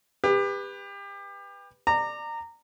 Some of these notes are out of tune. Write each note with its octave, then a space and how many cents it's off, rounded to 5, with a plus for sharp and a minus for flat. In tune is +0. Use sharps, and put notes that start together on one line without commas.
G4 +30 B4 +0
D5 +20 A#5 -20